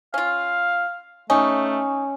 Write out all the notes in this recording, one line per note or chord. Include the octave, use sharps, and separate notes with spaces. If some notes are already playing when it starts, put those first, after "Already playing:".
C#4 F4 F5
A3 C#4 D#4